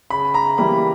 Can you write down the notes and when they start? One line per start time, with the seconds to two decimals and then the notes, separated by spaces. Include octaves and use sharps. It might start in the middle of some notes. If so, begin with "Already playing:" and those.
0.10 C#3 B5
0.34 A#5
0.58 E3 G3 A#3 B5